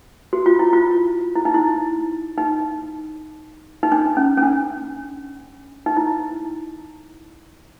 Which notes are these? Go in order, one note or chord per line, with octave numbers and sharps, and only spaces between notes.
F#4
F4
E4
F4
E4
D#4
E4
D#4
D#4
D4
C#4
C#4
D4
D#4
E4